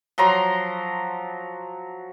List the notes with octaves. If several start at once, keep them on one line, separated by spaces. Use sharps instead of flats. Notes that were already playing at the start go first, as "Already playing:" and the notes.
F3 F#3 A#5 C6